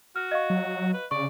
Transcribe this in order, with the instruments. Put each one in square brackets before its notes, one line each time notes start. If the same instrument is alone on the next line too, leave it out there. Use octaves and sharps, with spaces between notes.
[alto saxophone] F#4 [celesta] F6
[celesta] D#5 F5 C#6
[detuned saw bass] F#3
[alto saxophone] B4
[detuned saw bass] C#3 [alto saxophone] D5 [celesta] C#6